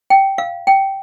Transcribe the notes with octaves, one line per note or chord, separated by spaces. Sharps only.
G5
F5
G5